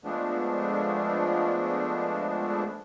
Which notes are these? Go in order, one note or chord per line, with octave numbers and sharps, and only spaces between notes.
F3 G#3 A3 B3 D4